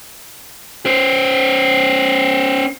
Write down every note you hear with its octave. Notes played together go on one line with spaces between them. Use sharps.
C#4 C5